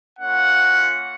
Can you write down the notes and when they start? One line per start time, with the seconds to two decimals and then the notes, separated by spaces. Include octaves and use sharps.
0.19 A#3 C#4 F4 F#5